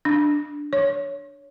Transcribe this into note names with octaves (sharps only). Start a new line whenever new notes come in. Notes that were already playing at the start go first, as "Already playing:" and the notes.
D4
C#5